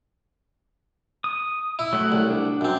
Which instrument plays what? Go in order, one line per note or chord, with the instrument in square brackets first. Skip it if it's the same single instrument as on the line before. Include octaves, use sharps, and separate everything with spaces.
[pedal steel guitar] D#6
[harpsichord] E4
[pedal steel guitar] F#3 A3 F#5
[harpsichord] C2
[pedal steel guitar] D4
[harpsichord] F#2 C4